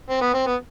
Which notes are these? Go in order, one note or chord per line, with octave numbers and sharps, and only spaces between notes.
C4
B3
C4
B3